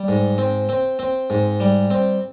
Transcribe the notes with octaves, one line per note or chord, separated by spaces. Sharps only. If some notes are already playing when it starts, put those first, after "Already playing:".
Already playing: G3
G#2
C4
C4
C4
G#2
G3
C4